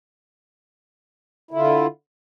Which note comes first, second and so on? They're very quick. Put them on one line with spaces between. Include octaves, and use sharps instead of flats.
E4 D3 F4